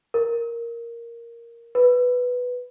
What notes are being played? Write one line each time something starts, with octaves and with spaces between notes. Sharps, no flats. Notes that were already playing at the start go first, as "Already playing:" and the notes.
A#4
B4